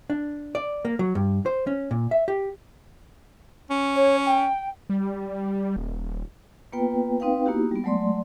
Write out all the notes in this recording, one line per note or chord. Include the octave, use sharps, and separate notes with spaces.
D4
D5
A#3
F#3
G2
C5
C#4
A#2
E5
G4
C#4
C#5
G5
G3
D#1
A#3 B3 F4 B4 G5
C4 D#4 B4 F5 G5
A#3 B3 D#4 E4 F#4 G4
G3 B3
F#3 G#3 A3 D5 C6